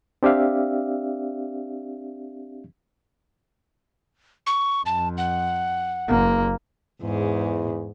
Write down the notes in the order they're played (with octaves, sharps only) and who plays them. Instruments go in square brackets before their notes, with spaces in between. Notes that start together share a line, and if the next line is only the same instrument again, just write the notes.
[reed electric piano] C4 D4 G4 D5 E5 F5
[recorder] C#6
[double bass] F2 [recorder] A5
[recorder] F#5
[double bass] F#1 A#3
[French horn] E2 [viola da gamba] G#2